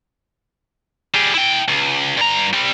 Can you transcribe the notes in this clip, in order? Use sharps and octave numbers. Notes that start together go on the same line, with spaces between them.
G3 G#4
E4 G5
C#2
G2 A#5
G3 C4